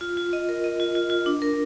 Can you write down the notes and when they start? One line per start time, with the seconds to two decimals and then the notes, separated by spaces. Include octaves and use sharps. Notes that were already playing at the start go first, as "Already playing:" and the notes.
0.01 F4
0.17 F4
0.33 D#5
0.49 A#4
0.64 D#5
0.80 F4
0.95 F4
1.10 F4
1.26 D4
1.42 A#4